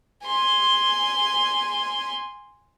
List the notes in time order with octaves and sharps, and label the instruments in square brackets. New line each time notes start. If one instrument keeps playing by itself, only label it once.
[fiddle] G#5 C6